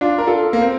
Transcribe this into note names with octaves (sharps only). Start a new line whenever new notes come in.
D4 F4
A#4
F4 A4
A#3
C4